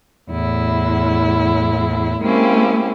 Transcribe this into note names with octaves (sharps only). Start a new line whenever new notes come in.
E2 A2 E4
G#3 A#3 C4 C#4 E4 G4